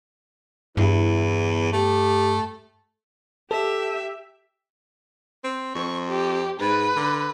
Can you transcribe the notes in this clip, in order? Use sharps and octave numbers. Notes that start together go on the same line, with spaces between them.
E2 G2 E4
A3 G4
G4 A4 E5
C4
F2 C#6
G4
G#2 B4
D3